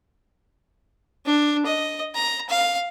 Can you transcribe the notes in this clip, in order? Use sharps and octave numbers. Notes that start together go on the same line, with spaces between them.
D4
D#5
A#5
F5